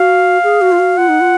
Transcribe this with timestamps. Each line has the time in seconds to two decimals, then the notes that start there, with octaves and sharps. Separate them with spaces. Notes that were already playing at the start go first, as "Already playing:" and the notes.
Already playing: F#4 F5
0.44 G#4
0.61 F#4
0.72 F4
0.79 F#4
0.97 F4 F#5
1.09 D#4
1.21 F4